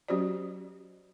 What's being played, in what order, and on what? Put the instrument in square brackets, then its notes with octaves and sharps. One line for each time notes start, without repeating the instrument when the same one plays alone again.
[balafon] F#3 C#4 F#4 G4 C5 D5